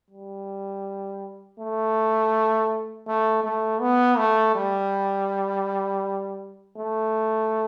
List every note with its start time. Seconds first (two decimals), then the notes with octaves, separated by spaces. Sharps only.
0.11 G3
1.59 A3
3.07 A3
3.44 A3
3.81 B3
4.17 A3
4.55 G3
6.76 A3